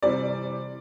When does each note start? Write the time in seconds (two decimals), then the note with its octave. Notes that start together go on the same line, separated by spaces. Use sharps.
0.02 C3 E3 G3 C4 D5